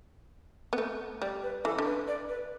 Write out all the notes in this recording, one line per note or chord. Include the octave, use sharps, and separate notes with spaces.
B3
A3
G3 D5
B4
E3 A4
D3
B4
D5
B4